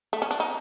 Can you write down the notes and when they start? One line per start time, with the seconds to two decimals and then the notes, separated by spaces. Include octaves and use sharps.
0.13 A3
0.22 C#4
0.31 D4
0.40 D#4